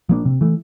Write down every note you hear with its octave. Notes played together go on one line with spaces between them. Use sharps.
F3 A#3 D4
C3
E3 A3